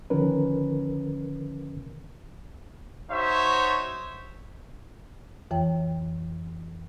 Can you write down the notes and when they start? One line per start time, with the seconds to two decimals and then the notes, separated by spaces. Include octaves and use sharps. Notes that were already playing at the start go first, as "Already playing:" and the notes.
0.10 D3 D#3 F3 C#4 A#4 B4
3.10 D#4 F#4 C5 C#5 E5
5.51 F2 E3 C#5 G5